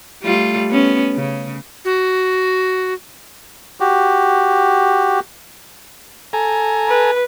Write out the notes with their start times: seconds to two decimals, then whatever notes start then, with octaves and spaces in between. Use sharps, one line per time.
0.23 G3 A3 F4
0.70 B3 C#4
1.16 C#3
1.85 F#4
3.80 F#4 G4
6.33 A4 G#5 A#5
6.88 B4